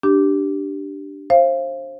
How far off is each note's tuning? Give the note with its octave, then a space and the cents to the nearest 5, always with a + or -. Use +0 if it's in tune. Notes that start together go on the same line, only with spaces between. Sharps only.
D4 +0 G4 -10
C5 +30 F5 -25